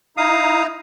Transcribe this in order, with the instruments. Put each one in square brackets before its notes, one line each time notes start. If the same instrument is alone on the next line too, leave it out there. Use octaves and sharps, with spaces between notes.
[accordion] D#4 E4 A#5 [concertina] F5 D#6